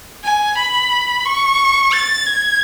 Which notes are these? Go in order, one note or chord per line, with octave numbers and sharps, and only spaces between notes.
G#5
B5
C#6
A6
G#6